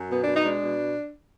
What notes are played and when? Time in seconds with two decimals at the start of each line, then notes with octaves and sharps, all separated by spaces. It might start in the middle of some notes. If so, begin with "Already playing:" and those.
Already playing: F#2
0.10 B2 B3
0.21 D4
0.28 B2
0.34 D#4
0.44 G#3 D4
0.63 B2